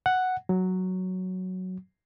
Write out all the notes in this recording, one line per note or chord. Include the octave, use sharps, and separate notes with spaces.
F#5
F#3